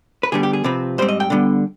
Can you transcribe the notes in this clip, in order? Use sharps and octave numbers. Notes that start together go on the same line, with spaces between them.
B4
D3 G3 B3 G#4
G4
G#4
C3 F3 C4 B4
G#2 G3 C4 C5
D#5
G5
D3 G3 B3